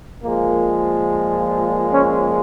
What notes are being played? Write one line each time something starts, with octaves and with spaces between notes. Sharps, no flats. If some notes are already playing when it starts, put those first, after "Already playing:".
A#2 F3 G#3 A#3
C#4